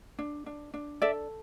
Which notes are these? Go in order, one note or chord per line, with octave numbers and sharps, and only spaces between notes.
D4
D4
D4
A4 D5 E5